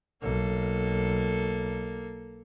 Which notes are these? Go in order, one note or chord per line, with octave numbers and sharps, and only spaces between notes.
B1 A#3 A4